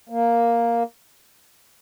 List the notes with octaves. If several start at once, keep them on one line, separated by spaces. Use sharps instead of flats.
A#3